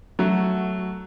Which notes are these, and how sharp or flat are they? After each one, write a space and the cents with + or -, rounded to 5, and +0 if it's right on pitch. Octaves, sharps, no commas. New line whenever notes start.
F#3 +10 A3 +0 F#4 +0